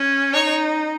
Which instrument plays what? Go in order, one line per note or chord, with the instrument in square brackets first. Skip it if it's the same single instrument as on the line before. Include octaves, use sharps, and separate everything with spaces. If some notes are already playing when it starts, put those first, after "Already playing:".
Already playing: [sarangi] C#4
[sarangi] D#4 [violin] C#5